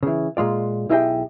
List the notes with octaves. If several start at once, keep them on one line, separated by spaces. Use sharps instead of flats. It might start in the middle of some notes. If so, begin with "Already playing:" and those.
C#3 E3
A#2 G#3 F4 D5
B1 E4 G4 G#4 D#5 G5